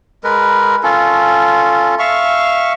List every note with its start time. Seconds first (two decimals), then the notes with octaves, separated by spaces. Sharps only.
0.24 G#3 A#4 B4
0.83 C#4 F4 A4
1.99 E5 F5 C#6